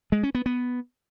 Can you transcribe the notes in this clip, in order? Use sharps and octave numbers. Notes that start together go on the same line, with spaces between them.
G#3
C#4
B3
B3